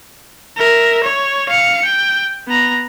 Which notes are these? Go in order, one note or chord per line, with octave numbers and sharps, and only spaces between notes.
A#4 E5
C#5
F5 C#7
G5
B3 A#5